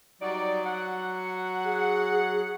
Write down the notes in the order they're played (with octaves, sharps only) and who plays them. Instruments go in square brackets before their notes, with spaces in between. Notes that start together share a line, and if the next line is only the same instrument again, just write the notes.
[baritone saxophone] F#3 [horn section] G3 D#4 D5
[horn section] F#5
[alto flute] G#4